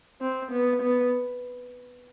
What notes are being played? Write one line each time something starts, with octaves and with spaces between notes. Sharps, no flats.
C4
B3
B3